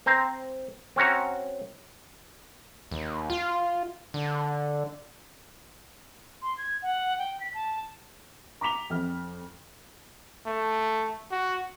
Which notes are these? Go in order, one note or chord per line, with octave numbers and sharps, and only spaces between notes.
C4 C5 A#5
C4 C#4 F#4 A#5
D#2
F4
D3
C6
G#6
F#5
G5
B6
A5
A#5 D6 B6 F7 G7
F2 F6
A3
F#4